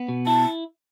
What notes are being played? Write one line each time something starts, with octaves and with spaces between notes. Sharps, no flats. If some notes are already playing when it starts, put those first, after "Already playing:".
Already playing: B3
B2
E4 A5